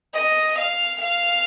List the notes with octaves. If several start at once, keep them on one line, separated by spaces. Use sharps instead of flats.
D#5
F5
F5